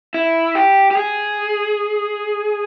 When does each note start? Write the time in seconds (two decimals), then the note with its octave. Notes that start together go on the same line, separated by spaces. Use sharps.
0.14 E4
0.55 G4
0.91 G4
0.97 G#4